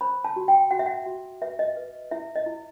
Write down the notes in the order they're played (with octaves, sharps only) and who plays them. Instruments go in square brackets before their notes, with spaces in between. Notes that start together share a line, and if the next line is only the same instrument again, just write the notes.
[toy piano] C5 B5
A5
F#4
G5
F#4 F#5
E5
F#5
F#4
B4 E5
D#5
B4
E4 E5
D#5
E4